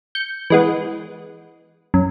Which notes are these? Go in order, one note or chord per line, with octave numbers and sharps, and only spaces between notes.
G6 C#7
E3 G#3 B3
F#2